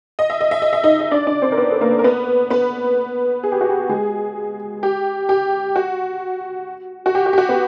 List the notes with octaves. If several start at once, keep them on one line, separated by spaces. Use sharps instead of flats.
D#5
E5
D#5
E5
D#5
E5
D#4 D#5
D#5
D4 D5
D4 D5
C4 C5
A#4
B3 B4
A4
A#3 A#4
A#4
B3 B4
B3 B4
G#4
G4
F#4
G4
G#3 G#4
G4
G4
F#4
F#4
G4
F#4
G4
F#4
B3 B4